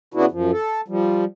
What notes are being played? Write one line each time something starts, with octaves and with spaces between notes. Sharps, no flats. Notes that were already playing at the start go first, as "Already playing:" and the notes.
C#3 B3 D4 E4 F#4
F#2 F3
A4
F3 G3